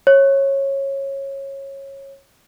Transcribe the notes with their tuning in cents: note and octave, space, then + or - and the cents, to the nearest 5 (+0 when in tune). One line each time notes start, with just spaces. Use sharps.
C#5 -20